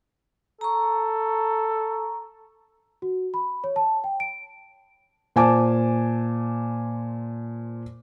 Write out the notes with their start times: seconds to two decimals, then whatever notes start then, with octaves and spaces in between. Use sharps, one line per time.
0.61 A4 A#5 C#6
3.02 F#4
3.34 B5
3.64 C#5
3.76 A5
4.04 G5
4.20 D7
5.36 A#2 C5 G#5 A5 D6